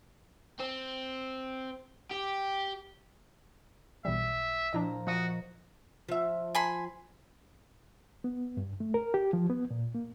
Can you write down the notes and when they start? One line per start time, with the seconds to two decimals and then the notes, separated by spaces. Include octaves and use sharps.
0.60 C4
2.11 G4
4.05 B1 E3 G3 E5
4.73 A#2 F3 D4 E4 D#5 A#5
5.07 F3 F#4 D#5 D#6
6.09 F3 E5
6.55 G#5 B5 C6
8.24 B3
8.57 G2
8.80 A3
8.94 A#4
9.14 G4
9.33 F3
9.50 B3
9.71 A#2
9.95 A#3